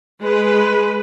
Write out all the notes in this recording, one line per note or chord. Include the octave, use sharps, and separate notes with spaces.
G#3 B4